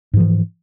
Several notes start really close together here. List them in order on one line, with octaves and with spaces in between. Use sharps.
G#2 F3 E3